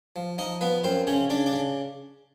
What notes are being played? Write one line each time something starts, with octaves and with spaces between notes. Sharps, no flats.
F3
F3 D#4 D#5
F3 B3 B4
F#2 C4 C5
C#3 C#4 C#5
C#3 D4 D5
D4 D5
C#3